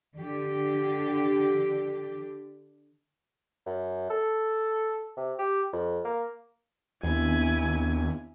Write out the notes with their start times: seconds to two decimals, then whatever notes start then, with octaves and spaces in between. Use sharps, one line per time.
0.15 D3 D4 G4
3.67 F#2
4.10 A4
5.17 C3
5.39 G4
5.73 F2
6.05 A#3
7.03 D#2 B3 C4 D4 E4 G#5